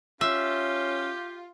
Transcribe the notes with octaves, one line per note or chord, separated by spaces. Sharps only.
C#4 F4 G4 E5